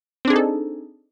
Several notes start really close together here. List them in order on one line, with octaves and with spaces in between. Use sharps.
C4 D4 G#4 D#4 A4